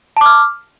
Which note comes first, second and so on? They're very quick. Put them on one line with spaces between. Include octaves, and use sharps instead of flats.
A5 D6 F6